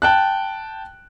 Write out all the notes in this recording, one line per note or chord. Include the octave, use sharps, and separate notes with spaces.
G5 A5 F#6